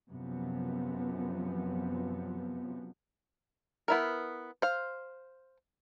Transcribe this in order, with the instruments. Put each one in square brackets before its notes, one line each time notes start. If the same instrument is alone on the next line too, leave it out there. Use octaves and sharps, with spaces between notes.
[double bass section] F#2 C3 F3 B3
[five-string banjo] B3 E4 A#4
C5 F5